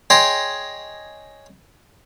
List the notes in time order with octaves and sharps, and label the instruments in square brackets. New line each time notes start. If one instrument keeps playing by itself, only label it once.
[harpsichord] G#4 C#5 D#5 G5 C6